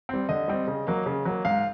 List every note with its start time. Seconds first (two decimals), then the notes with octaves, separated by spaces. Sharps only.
0.09 G3 C4
0.29 D3 D#5
0.48 G3 C4
0.67 C#3
0.87 F#3 A#3
1.06 C#3
1.25 F#3 A#3
1.45 G#2 F5